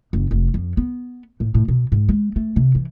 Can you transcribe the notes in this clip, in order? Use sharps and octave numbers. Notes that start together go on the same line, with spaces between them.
F#1
F1
F2
B3
A2
A2
B2
G#2
G#3
A3
C3
E3